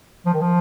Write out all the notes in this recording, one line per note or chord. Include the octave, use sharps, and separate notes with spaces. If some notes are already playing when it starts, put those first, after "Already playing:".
F3
D#3
F3